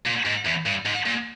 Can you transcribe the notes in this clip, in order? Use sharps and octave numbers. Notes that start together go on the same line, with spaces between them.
A#2
G#2
E2
G2
G#2
A#2